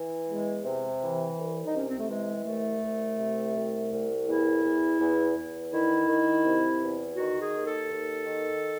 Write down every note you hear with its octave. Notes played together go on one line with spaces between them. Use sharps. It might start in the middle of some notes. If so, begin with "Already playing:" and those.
Already playing: E3
E2 G#3
C3
E3
C2
D#4
C3 C#4
C4
A3
E3 G#3
C2 A3
C2
C3
C2
C2
E2 E4
E2
E2
E2
D#3 E4
D#3
C3
E2
D#3 F#4
G#4
D#2
A4
D#2
D#3